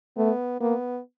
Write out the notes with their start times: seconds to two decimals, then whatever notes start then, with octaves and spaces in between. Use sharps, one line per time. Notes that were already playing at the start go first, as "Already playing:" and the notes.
0.17 A3 B3
0.60 A#3 B3